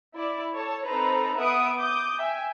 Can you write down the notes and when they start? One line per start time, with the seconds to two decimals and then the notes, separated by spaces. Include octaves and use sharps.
0.16 E4 D5
0.54 A4 C#5 A5
0.84 C4 D#4 A4 B4 C5 A#5
1.37 B3 B4 E5 F#5 D#6 D7
1.78 D6 D#6 G6
2.19 E5 G5 G#5